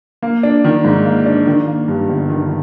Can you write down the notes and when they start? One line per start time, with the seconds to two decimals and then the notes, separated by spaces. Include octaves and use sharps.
0.22 A#3
0.43 D4
0.64 D#3
0.84 G#2
1.05 A#3
1.26 D4
1.47 D#3
1.67 A#3
1.88 G2
2.09 G1
2.30 D#3